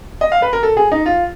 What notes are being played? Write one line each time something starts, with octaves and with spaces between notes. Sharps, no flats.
D#5
F5
B4
A#4
A4
G#4
D#4
F4